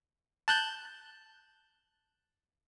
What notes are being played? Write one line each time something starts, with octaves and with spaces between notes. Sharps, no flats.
A5 F#6 G6